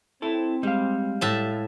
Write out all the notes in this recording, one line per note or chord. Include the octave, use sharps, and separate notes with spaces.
C4 E4 A4
G3 G#3 F5
A2 E5 A5